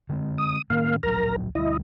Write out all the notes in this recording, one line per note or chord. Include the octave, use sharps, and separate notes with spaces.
D3 G#3 C4
D#6
A2 D#3 A#3 C#4 F5
D1 A#1 F#3 A#4 A#5
D2 G3 E4 D#5